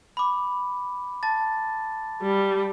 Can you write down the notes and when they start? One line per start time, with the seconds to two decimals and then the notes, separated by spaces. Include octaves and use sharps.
0.17 B5 D6
1.23 A5 A6
2.22 G3